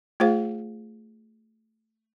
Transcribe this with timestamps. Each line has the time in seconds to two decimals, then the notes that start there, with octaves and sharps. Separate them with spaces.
0.20 A3 F4 G#4 C5 F5